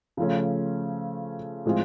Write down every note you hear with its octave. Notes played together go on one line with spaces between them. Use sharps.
C#3 F3 A3 C#4
A2 F3 G#3 C4 F4